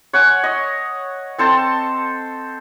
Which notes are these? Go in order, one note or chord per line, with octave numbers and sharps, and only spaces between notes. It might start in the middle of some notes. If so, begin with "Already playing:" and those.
C#5 F#5 G#5
D#5
C4 A4 C5 A5